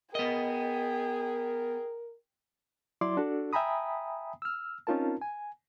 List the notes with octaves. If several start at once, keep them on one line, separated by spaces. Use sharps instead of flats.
B3 G#4 A#4 D#5 G5
F#3 E4 D5 C6 D6
D4 F#4 A4
E5 G5 G#5 A#5 B5 D#6
E6 F6
C4 C#4 D#4 F4 A#4 A5
G#5